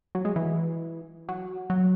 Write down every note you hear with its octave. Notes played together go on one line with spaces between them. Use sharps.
F#3
G#3
E3
F#3
F#3